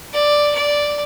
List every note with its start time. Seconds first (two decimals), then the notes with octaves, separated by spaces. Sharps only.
0.13 D5
0.55 D5